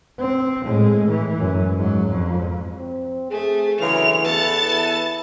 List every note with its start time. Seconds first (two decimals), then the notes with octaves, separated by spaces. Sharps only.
0.19 C4
0.64 A2 G#3
1.10 E3
1.39 F#2
1.76 G#2 F#3
2.09 F2
2.78 C4
3.31 A3 G#4
3.80 D2 C#3 E3 F#3 F7
4.25 E2 B3 E4 A4 A5 A6